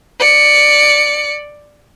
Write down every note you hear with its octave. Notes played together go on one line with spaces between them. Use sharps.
D5 C#7